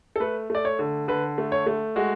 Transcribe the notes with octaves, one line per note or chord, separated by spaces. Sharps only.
A4
A3 B4
A3 D5
C#5
D3
D3 B4
A3
C#5
A3
G#3 F#4